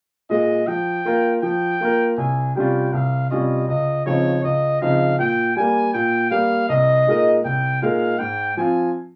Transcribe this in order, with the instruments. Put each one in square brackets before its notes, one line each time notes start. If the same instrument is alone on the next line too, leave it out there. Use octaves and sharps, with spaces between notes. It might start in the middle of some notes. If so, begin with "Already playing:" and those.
[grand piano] A#2 G#3 [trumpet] D#5
[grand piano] F3 [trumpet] G5
[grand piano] A#3 F4 A#4
[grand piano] F3 [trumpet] G5
[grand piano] A#3 F4 A#4
[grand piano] C2 [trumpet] G#5
[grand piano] C3 G3 C#4 F4 [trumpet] G5
[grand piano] C2 [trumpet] F5
[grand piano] C3 G3 C#4 F4 [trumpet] D#5
[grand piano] C#2 [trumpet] D#5
[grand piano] C#3 F3 C4 D#4 [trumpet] C#5
[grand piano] C#2 [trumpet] D#5
[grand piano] C#3 F3 C4 D#4 [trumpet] F5
[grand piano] A#2 [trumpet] G5
[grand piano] G3 A#3 [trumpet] G#5
[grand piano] A#2 [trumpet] G5
[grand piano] G3 A#3 [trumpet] F5
[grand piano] C2 [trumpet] D#5
[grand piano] A#2 G#3 D#4 A#4
[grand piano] C2 [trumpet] G5
[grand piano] A#2 G#3 D#4 A#4 [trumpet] F5
[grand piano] G#2 [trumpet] G5
[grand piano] F3 C4 F4 [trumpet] G#5